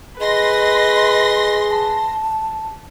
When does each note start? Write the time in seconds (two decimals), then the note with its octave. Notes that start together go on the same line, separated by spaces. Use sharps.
0.21 G#4 B4 D#5 C6 A#6
1.71 A5